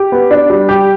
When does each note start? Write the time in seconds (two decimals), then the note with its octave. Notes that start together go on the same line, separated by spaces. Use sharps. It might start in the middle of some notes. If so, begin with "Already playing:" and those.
Already playing: G4
0.12 B3
0.31 D4
0.50 G3
0.69 G4